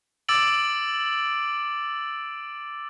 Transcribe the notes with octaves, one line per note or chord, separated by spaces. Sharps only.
D6 E6 A6 D7 F#7